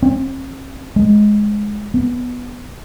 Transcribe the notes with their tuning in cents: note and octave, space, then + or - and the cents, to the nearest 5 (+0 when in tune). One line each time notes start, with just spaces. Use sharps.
C4 +45
G#3 +5
B3 +0